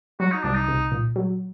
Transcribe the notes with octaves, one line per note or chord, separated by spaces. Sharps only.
F#3 F#4
D#4
C2 D4
D#4
C2
A#2
F#3